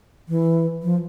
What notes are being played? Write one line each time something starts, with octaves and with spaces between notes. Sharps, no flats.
E3
F3